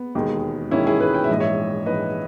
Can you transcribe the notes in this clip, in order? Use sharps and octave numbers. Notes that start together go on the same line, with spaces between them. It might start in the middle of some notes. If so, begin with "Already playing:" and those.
Already playing: B3
E1 D#2 D#3 G#3
E1 D#2 D#3 G#3 C#4 E4
E4 G#4
G#4 B4
G5
E5
A#1 G#2 E3 G#3 D#5
C#5 E5
A#1 G#2 E3 G#3 B4 D#5